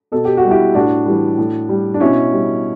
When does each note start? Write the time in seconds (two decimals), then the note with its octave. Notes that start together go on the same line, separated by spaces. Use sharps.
0.12 B2 A4
0.25 G4
0.37 F#4
0.44 G3
0.51 E4 G4
0.75 A2 D4 F#4
1.06 E3 G3
1.38 A2
1.69 G3
1.94 D4
2.00 B2 C#4 E4
2.32 G3